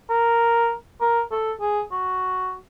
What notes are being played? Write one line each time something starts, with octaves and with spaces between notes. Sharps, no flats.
A#4
A#4
A4
G#4
F#4